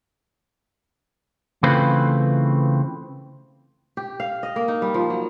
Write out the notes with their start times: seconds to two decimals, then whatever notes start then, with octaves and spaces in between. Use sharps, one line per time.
1.63 C#3 E3 A3 C4 F4 B4
3.97 G4
4.20 F5
4.43 D#5
4.56 A#3
4.68 D#4
4.82 G3
4.94 F3
5.10 F#3